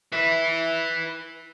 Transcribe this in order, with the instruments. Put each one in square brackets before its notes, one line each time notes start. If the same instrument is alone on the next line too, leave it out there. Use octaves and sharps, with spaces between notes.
[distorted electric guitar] B4 E5